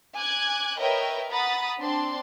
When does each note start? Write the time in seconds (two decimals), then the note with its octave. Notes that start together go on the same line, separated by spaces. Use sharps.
0.16 G#5 D6 F#6 G#6
0.80 A#4 B4 C#5 D#5 E5 G5
1.30 F#5 A#5 B5 D#6 A6
1.80 C4 D4 A5 C6